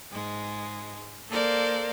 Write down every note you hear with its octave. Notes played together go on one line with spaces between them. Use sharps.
G#2 G#3
A#3 A4 A#4 C5 D5 F5